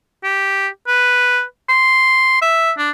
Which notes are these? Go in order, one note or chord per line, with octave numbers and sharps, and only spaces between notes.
G4
B4
C6
E5
D4